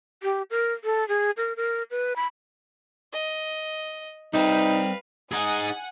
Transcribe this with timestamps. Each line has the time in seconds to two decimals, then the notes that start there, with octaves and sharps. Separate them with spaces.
0.23 G4
0.50 A#4
0.84 A4
1.09 G#4
1.37 A#4
1.57 A#4
1.91 B4
2.16 B5
3.13 D#5
4.33 G3 C4 D#4 G4 B4 F5
5.32 D#4 G#4 F#5 G#5